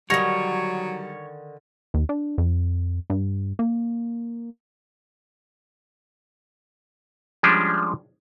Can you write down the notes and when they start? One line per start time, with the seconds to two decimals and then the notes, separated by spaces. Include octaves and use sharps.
0.10 D3 D#3 F#3 G3 C#5 A#6 F7
1.94 D#2
2.09 D4
2.38 F2
3.10 G2
3.59 A#3
7.43 F3 G3 G#3 C#4 D4